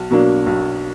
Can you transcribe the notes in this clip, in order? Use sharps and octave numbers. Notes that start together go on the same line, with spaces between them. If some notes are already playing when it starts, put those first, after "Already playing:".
Already playing: B1
B2 F#3 A#3 D4
B1